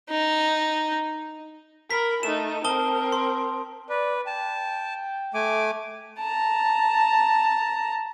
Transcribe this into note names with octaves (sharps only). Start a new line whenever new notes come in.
D#4
A#4 B5 B6
A3 D#4 E7
C4 A#4 A5 D#6 G7
C6
B4 D5
G5 A5
A3 G#5 D6
A5 A#5